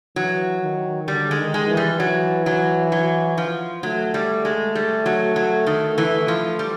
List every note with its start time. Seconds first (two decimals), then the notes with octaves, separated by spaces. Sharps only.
0.16 E3 F#3
0.62 D#3
1.08 D3 G3
1.31 G#3
1.39 D#3
1.54 G#3
1.69 E3
1.77 G3
2.00 E3 F#3
2.46 F#3
2.92 F#3
3.38 F3
3.83 F#3 A3
4.14 G3
4.45 G#3
4.75 G3
5.06 F#3
5.36 F#3
5.66 D#3
5.98 E3
6.28 F3
6.59 G3